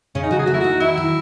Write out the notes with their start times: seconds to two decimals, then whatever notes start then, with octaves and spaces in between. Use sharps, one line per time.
0.15 C#3 C#4
0.23 D#4
0.31 F#3 F#4
0.39 G#4
0.46 A3 F#4
0.54 E4
0.60 D#4 F#4
0.80 D#3 E4
0.97 F#3